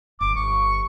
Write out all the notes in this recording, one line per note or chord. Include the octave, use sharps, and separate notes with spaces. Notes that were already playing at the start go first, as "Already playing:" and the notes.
G1 D6
C#6